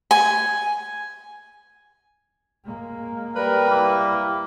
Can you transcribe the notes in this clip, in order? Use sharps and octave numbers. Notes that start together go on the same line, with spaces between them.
G#5
G#3 A#3
G3 A#4 B4
A#3 E4